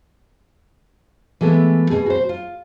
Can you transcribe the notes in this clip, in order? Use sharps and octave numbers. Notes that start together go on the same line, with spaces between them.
E3 G#3 A3 B3
B2 G#4
F#4 C5
F4